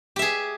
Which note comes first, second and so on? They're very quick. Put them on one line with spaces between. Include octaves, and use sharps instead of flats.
G4 E5 G#4